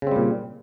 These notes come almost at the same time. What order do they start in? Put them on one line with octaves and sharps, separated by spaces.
C#3 C4 G3 A#2